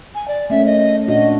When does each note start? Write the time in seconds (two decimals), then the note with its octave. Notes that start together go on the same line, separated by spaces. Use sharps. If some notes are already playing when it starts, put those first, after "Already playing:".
0.15 G#5
0.28 D5
0.50 A3 A#3 C#4 E5
0.66 D#5
1.08 A#2 D4 F#4 D#5